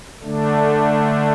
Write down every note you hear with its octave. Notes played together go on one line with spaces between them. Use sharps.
D3 A3 D4